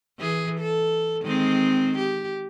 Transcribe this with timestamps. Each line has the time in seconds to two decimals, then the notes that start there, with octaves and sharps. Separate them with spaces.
0.19 E3 G#4
0.60 A4
1.23 D#3 G#3 C4
1.99 G4